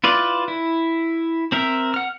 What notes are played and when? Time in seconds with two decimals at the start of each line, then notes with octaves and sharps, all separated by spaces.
0.04 E4 F4 B4 D5
0.48 E4
1.52 C4 A#4 E5
1.94 F#5 F6